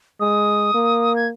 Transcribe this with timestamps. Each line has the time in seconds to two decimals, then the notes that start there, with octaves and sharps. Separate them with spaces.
0.20 G#3 D#6
0.74 A#3
1.16 G#6